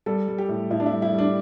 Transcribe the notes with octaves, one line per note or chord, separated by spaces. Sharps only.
G3 A4
G3
G4
A2
A2 E4
D4
E4
G3
E4
G3
D4